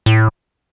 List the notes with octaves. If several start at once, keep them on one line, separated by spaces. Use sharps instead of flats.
A2